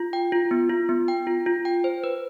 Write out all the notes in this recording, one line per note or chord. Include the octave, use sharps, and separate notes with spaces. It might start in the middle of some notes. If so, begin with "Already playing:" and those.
Already playing: F4
G5
F4
B3
F4
B3
G5
F4
F4
G5
C5
B4